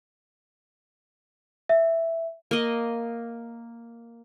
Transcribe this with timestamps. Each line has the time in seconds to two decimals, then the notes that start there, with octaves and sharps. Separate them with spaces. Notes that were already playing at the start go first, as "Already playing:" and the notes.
1.69 E5
2.51 A#3 D#5